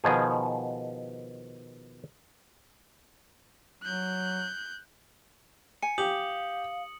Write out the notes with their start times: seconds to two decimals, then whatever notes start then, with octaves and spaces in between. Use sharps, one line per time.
0.04 B2 D#3 F3 G#4
3.83 F#3 F#6 G6
5.82 G#5 C#7
5.98 G4 F5 D#6 F#7